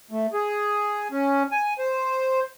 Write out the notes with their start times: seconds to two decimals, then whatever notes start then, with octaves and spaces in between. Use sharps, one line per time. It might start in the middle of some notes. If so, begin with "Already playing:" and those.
0.11 A3
0.33 G#4
1.12 C#4
1.51 G#5
1.79 C5